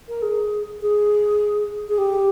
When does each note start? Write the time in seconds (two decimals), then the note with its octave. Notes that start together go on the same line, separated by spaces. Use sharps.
0.09 A#4
0.22 G#4
0.82 G#4
1.89 G#4
1.98 G4